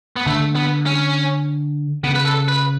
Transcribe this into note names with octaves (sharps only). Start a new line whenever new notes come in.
B3
D3 A3
B3
C#4
C#3 B3
B4
A4
B4